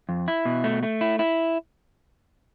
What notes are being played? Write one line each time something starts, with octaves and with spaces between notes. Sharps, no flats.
F2
E4
B2
A3
A3
E4
E4